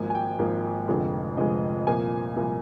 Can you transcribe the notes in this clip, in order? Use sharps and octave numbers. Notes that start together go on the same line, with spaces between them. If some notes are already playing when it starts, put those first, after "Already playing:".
Already playing: G#1 G#2 F3 A#3 G#5
G#5
G5
G#1 G#2 F3 A#3
F1 F2 D3 F3 G#3
F1 F2 D3 F3 G#3 D#5
C2 A#2 F3 A#3 G#5
C2 A#2 F3 A#3